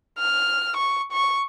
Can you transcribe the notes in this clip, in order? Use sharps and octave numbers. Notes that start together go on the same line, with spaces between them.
F6
C#6
C#6